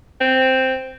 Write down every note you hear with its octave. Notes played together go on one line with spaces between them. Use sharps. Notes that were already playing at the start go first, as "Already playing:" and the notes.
C4